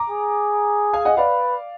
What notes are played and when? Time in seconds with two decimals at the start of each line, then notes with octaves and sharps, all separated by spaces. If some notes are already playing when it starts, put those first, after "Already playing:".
Already playing: A#5 D6
0.10 G#4
0.93 F5 G#5
1.05 D#5 F#5
1.17 B4 D5 F5